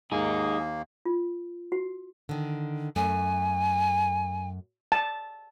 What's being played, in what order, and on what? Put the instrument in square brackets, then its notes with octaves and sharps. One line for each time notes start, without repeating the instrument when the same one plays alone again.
[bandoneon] D#2 A#3 [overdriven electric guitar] D#4 G#4
[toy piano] F4
F#4
[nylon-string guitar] D3 D#3
[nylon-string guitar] F#2 A3 [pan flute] G#5
[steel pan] A5